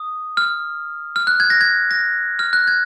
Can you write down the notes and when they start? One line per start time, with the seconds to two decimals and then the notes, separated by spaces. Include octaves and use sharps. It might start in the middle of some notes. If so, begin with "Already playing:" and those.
Already playing: D#6
0.37 F6
1.16 F6
1.27 F#6
1.40 G#6
1.50 A#6
1.61 G#6
1.91 A#6
2.39 F6
2.53 F#6
2.67 G#6